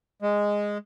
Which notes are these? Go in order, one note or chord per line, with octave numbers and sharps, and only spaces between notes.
G#3